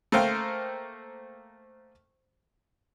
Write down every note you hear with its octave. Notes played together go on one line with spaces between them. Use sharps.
A3 A#3 C5 F5 G5